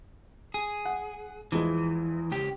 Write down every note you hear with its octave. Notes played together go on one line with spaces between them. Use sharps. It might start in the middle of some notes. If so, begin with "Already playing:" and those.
G#4
F#5
E2 E3 F3 G#3
C#2 G4